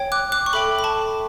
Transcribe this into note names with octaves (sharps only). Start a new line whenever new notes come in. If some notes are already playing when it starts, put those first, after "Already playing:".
Already playing: C#5 G5
D6 F#6
D6 F#6
C#6
A4 E5 G5 B5 D6
B5
A5 C#6